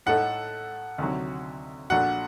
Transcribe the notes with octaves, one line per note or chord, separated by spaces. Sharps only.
A2 A3 D#4 A4 F#5
D2 C3 D#3 F#3
A#1 A#2 A3 D4 F#4 F#5